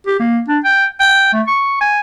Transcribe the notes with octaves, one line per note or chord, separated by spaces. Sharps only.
G4
A#3
D4
G5
G5
A3
C#6
G#5